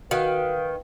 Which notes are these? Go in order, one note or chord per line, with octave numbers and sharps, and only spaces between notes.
D#3 F#4 B4 F5 F#5